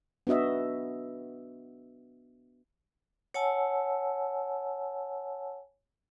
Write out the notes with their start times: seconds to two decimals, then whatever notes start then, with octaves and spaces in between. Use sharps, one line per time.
0.27 B3 D4 F#4 D#5 E5
3.34 C#5 F#5 G#5 A5 E6